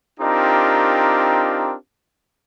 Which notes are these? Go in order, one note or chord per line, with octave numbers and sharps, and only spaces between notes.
C4 D4 D#4 F4 G4 A#4